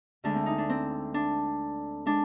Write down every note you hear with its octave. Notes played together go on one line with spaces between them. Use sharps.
D2 D3 G#3 D4
C4
D#4
D4
C4
D4
G#3 D4